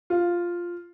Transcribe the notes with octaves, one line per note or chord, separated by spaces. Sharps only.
F4